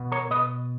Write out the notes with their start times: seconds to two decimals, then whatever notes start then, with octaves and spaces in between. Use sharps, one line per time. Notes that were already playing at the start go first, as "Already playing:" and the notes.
Already playing: B2 B3
0.12 A#4 C#5
0.30 B2 B4 D#5